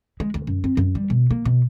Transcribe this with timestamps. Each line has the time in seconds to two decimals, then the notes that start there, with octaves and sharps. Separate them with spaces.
0.20 G#3
0.34 D2
0.47 F#2
0.64 C4
0.77 F#2
0.95 G3
1.10 B2
1.31 A#3
1.45 B2